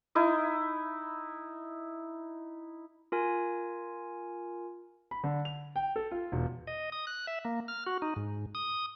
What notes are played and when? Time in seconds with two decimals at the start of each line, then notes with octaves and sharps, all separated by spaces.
0.15 D#4 E4 D#5
3.12 F4 A#4 G#5
5.11 B5
5.24 D3
5.45 F7
5.76 G5
5.96 A4
6.11 F4
6.32 E1
6.67 D#5
6.92 D#6
7.07 F#6
7.27 E5
7.45 A#3
7.68 F6
7.86 F#4
8.02 D#4
8.16 G#2
8.55 D#6